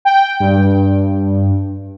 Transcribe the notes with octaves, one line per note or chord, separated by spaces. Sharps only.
G5
G2